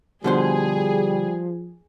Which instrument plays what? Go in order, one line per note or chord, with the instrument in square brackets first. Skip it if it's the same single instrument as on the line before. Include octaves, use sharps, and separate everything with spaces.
[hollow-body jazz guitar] B2 D3 C5 [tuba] F3 [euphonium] G3 [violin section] G#4